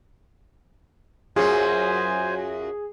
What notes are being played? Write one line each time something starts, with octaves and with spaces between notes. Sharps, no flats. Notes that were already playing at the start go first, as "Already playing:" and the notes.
F#2 F#3 F4 G#4 C5 G#5